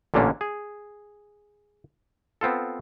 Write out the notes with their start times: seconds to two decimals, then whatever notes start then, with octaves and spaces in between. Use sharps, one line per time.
0.14 A1 A#2 D3 A#3 C#4 D4
0.41 G#4
2.41 B3 C4 F4 A4